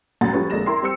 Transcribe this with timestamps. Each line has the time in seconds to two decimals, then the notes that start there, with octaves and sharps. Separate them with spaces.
0.21 F#1 B1 F#2 A2 F#5 A6
0.33 F3 G3 A3 C#4 B4
0.50 F1 D3 G#3 A#3 A#6 E7
0.66 E4 A#4 G5 C6
0.82 G3 C4 C5 E6 C#7